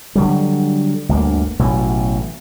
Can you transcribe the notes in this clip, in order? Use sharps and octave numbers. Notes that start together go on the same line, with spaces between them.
D3 F#3 G3
G1 D2 A#3
A1 B2 F#3